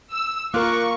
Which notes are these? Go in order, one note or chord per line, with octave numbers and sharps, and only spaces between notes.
E6
A#3 F4 A#4 C#6 D6 F#6